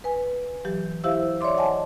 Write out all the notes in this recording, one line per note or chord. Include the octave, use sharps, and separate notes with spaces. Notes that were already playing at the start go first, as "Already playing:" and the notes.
B4 G#5
E3 F#3 G4
E4 G4 C5 E5 F5 E6
C#5 D5 E5 C6 D6
D#5 F#5 G#5 A5